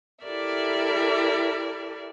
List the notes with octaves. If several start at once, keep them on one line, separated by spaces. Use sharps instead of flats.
E4 G4 A4 A#4 D5 E5